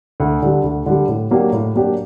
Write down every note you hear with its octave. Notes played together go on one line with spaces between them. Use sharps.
D2
D3 G3
D2
D3 G3
A2
F#3 A#3 D4 G4
A2
F#3 A#3 D4 G4